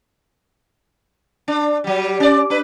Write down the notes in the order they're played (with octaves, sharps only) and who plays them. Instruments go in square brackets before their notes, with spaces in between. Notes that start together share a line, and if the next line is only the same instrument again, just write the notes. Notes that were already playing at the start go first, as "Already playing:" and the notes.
[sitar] D4
F#3 G3
C#4 D5
D4 B4